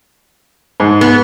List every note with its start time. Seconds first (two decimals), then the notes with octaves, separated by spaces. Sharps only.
0.80 G#2
1.01 B3